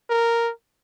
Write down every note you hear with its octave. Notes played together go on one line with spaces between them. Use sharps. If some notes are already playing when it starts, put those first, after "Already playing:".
A#4